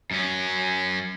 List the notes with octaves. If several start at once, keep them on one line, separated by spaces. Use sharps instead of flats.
F#2 C#4